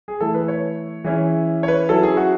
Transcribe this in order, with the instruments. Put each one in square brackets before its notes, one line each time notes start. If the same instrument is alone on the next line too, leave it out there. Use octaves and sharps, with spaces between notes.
[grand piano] G#4
E3 A3 E4 A4
B4
C#5
E3 G#3 C#4 E4
C#5
B4
F#3 C#4 E4 A4
G#4
F#4